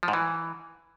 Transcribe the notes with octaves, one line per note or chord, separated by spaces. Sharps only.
F3
G#2
E3